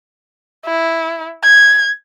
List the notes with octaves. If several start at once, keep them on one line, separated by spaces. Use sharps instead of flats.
E4
G#6